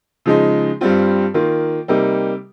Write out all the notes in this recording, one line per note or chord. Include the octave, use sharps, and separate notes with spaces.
C#3 F3 G#3 D#4
G2 G3 C4 F4
D#3 A#3 F4
C3 G3 A#3 D#4